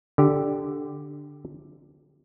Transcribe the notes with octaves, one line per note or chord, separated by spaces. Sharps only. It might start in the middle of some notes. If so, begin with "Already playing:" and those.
D3 G4